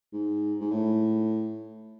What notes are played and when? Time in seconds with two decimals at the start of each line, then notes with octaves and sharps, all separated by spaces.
0.13 G#2
0.61 G#2
0.71 A2